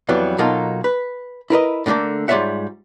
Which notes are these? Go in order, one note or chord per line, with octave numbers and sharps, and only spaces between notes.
F2 E3 F#3 G3 B3
B2 F#3 A#3 D#4 F4 A4
B4
E4 A#4 B4 D#5
A2 D3 D#3 A3 A#3
G#2 G3 F4 C#5 E5 F#5